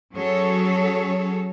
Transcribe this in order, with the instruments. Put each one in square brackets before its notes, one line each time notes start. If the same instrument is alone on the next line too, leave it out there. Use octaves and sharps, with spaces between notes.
[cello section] F#3 C#4 F#4 G#4 A4 C#5